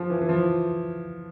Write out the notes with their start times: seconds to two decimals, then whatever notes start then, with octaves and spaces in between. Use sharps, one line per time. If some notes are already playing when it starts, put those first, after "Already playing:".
Already playing: F3
0.10 E3
0.22 E3
0.29 F3